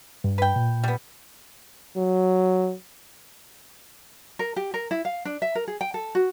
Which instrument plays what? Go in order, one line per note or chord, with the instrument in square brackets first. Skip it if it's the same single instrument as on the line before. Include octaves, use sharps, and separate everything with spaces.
[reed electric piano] G2
[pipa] B4 G5
[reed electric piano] A#2
[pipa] G3 B3
[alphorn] F#3
[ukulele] A#4
G4
A#4
E4
F5
D4
E5
A#4
G#4
G5
A4
F#4